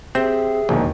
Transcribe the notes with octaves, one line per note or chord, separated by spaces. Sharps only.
C4 G4 G#4 E5
E1 A#1 D#2